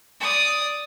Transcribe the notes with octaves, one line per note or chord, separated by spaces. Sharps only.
D5 D#6